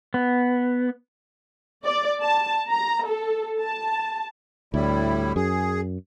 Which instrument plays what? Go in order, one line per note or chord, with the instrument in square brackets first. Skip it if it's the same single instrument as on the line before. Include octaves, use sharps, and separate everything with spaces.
[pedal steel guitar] B3
[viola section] D5
A5
A#5
A4
A5
[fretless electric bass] D2 [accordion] A2 G3 E4
[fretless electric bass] F#2 [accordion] G#4